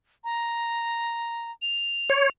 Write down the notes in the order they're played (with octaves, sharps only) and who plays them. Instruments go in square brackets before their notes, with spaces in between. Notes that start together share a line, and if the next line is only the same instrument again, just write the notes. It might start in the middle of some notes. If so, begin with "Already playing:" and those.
[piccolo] A#5
F7
[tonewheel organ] C#5